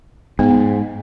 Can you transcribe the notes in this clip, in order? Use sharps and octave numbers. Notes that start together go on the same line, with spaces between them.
G#2 B3